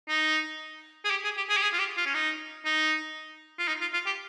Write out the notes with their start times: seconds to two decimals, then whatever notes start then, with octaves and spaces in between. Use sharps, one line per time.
0.08 D#4
1.05 G#4
1.11 G4
1.24 G#4
1.37 G4
1.49 G#4
1.57 G4
1.63 G#4
1.73 F4
1.79 G4
1.97 F4
2.06 C#4
2.14 D#4
2.65 D#4
3.59 F4
3.68 D#4
3.81 F4
3.94 F4
4.06 G4